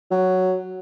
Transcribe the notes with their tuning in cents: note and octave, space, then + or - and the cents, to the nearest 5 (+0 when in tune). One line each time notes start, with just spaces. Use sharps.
F#3 +5